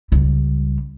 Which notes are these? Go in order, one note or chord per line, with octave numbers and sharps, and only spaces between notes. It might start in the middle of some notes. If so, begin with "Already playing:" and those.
C#2 G3